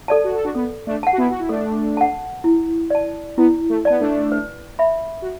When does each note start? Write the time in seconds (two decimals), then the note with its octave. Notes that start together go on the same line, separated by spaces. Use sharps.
0.08 A4 D5 A5
0.24 F#4
0.35 A4
0.45 D4 F#4
0.55 B3 A4
0.87 A3 D4
1.03 F#5 A5
1.13 F#4
1.18 B3 E4
1.30 F#4
1.40 E4
1.49 A3 D4 A4
1.97 F#5 A5
2.44 E4
2.90 D5 A5
3.37 B3 E4
3.69 A3
3.85 B3 D5 A5
4.00 A3 D4
4.32 B4
4.79 E5 B5
5.22 F#4